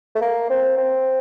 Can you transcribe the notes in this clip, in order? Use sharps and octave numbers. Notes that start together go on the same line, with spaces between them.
A3
A#3
C4
C4